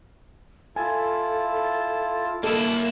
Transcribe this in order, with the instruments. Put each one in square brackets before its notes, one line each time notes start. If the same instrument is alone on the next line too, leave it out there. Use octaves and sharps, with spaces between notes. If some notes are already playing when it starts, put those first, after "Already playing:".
[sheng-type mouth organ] E4 F4 A5 [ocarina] A4 [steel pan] G#5
[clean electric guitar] A#3 E4 [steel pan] A4 D#5